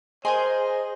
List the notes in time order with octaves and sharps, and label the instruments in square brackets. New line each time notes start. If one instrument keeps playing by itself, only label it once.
[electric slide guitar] G#4 [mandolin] A#4 G#5 C6 [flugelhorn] C5 [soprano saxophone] D#5